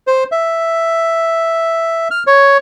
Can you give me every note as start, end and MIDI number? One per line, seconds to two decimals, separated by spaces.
0.07 0.24 72
0.32 2.08 76
2.11 2.23 89
2.27 2.57 73